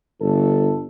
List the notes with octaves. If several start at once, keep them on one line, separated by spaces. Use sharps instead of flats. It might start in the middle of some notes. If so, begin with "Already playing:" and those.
G1 A4